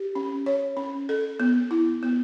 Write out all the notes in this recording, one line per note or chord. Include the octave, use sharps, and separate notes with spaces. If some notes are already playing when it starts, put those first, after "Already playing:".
Already playing: G4
C#4
C#5
C#4
A4
B3
E4
B3